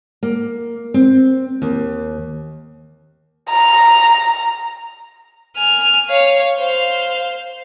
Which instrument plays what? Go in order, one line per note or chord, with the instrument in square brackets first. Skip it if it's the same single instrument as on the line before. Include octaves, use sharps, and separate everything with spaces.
[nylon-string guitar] A#3
C4
D#2
[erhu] A#5
[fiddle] G#5 F6
C#5 F5
C5 F5